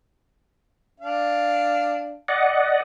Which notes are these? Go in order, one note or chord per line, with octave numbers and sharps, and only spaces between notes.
D4 F5
D5 D#5 F#5